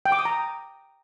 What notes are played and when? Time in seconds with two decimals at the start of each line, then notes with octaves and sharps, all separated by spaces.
0.06 G5
0.12 D6
0.19 D#6
0.25 A#5